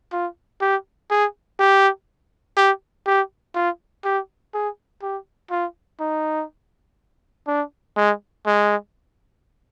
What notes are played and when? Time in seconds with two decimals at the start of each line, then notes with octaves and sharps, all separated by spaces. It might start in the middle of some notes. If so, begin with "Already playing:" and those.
0.12 F4
0.61 G4
1.10 G#4
1.60 G4
2.57 G4
3.07 G4
3.55 F4
4.05 G4
4.54 G#4
5.03 G4
5.51 F4
6.00 D#4
7.47 D4
7.97 G#3
8.46 G#3